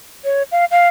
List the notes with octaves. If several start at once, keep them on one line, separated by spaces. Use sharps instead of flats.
C#5
F5
F5